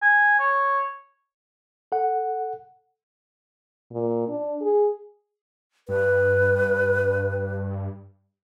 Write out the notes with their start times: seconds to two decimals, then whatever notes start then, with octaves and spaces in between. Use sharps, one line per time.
0.02 G#5
0.40 C#5
1.92 A4 F#5
3.92 A#2
4.29 D4
4.61 G#4
5.89 G2 B4